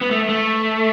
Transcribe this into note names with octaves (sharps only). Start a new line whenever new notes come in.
B3
A3
A3